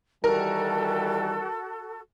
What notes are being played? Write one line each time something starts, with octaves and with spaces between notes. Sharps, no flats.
D#3 E3 G3 F#4 A4 A#4